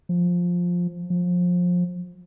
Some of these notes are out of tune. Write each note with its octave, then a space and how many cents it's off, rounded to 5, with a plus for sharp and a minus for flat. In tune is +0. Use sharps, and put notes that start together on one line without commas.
F3 +10
F3 +25